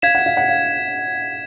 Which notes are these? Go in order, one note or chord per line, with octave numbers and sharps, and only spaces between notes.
F5 G#6 B6 E7
F#5
F5
F#5
F5